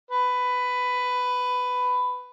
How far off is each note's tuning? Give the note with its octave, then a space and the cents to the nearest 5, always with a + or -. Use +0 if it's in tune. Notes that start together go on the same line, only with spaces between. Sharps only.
B4 +10